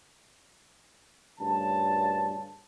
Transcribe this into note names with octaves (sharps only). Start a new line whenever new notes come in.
D2 G2 A#2 C#3 A5